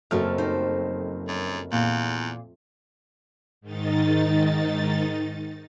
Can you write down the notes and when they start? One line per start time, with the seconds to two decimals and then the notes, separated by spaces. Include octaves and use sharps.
0.11 F#1 F2 F#3 A3 F6
0.38 D#4 G4 C5
1.28 F#2
1.72 E2 A#2
3.61 G#2 D#3 D#4 A6